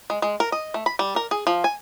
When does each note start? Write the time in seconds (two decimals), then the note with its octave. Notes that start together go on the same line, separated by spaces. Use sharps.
0.10 G#3
0.22 G#3
0.40 A#4
0.52 D#5
0.74 A3
0.86 B5
0.99 G3
1.16 A#4
1.31 G#4
1.47 F3
1.64 G#5